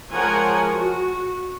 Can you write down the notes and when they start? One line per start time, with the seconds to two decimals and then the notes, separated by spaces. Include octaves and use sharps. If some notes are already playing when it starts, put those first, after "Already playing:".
0.11 F3 G#3 A#4 C#5 F#5 G#5
0.72 F#4